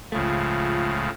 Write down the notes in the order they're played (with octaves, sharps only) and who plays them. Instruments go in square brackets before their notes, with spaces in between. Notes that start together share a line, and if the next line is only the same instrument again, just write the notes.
[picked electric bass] C#2 A3 [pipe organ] A2 C#3 F3 [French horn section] F4